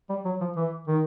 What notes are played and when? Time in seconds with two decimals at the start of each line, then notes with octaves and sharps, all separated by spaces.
0.10 G3
0.25 F#3
0.41 F3
0.56 E3
0.88 D#3